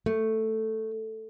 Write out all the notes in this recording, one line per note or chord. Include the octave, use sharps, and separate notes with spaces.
A3